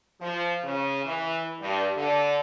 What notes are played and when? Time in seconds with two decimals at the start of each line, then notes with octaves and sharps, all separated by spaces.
0.20 F3
0.64 C#3
1.05 E3
1.60 G2
1.96 D3